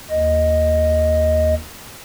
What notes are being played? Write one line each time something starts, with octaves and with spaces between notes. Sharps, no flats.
D#2 D#5